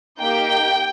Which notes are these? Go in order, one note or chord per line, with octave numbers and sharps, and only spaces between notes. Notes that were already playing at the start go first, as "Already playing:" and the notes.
A#3 D#4 G4 G5